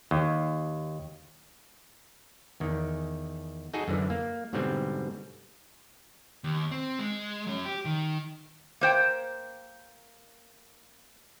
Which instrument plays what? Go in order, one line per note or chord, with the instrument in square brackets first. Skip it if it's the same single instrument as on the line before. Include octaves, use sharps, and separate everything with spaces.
[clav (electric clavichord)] D#2
E2 D#3
D#4 F#4 G#4 A4 D#5
F#2 D3 E3
A#3
G#2 B2 D3 G3 C4
[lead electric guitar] D#2
C4
G#3
F#3 C#4
G4
D#3
[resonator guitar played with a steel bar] A#3 C5 G5